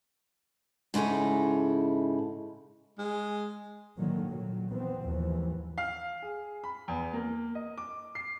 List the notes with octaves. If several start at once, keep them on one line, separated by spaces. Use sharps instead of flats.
G#2 C#3 D#4 E4 A4
G#3
A2 D3 D#3 F#3 A#3
A#2 F#3
D#3 E3 B3 C4
D#2 G#2 E3 F3
F5
G#4
B5
E2
A#3
D#5
D6
C7